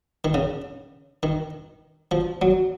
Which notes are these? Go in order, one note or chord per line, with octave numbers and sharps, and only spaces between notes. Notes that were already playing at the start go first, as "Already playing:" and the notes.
D#3
C#3
D#3
F3
F#3